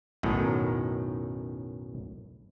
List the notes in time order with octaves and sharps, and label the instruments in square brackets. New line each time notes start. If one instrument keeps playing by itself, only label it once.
[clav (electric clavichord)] B1 F#2 A2 D#3